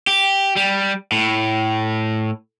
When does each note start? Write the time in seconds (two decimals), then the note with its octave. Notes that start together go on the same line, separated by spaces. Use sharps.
0.07 G4
0.56 G3
1.12 A2